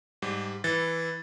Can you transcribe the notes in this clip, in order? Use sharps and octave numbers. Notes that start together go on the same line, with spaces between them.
G#2 G3
E3 A6